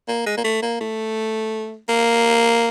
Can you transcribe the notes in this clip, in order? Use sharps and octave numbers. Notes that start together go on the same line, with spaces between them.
A#3
G#3
A#3
A3
A#3
A3
A#3